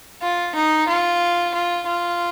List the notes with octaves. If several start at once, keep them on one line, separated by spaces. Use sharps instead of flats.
F4
D#4
F4
F4
F4